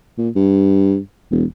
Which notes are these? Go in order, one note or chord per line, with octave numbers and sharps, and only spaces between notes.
A#2
G2
E1